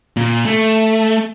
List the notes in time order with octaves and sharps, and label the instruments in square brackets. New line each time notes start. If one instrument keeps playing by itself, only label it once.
[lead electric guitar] A#2
A3